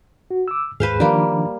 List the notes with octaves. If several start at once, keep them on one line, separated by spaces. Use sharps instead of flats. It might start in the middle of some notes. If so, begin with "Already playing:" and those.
F#4
D6 E6
D#2 G#2 G#4 B4 C5 F5
D#3 F3 G3 A#3 D4